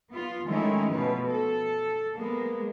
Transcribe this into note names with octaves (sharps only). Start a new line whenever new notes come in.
B3 F4
D#3 G#3 A3 C#4 D#4 E4
B2 F3 B4
A4
G#3 A#3 B3